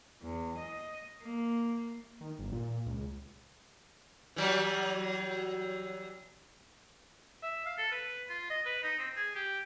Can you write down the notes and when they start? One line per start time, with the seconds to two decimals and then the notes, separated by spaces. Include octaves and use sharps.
0.22 E2
0.58 D#5
1.23 A#3
2.21 D#3
2.39 G1
2.52 A#2
2.86 C#2
4.36 E3 F#3 G3
7.43 E5
7.66 F5
7.78 A4
7.92 B4
8.29 F4
8.50 D#5
8.66 B4
8.83 D#4
8.99 C4
9.16 G#4
9.35 G4